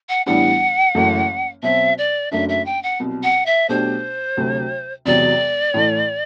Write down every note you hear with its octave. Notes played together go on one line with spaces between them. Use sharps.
F#5
A2 E3 G3 B3 D4 F#5
F#1 F#2 E3 A3
B2 F#3 C4 E5
D5
F#1 F#2 F#3 A3 D4 E5
E5
G5
F#5
C2 B2 F#3
F#5
E5
B1 B2 A3 D4 G4 C5
D2 C3 F#3 A3
E1 E2 C3 F#3 D5
A2 E3 A3